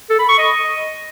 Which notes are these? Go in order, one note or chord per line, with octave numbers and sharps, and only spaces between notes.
A4
B5
C#6
D#5